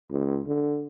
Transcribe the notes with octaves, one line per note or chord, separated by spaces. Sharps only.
C#2
D3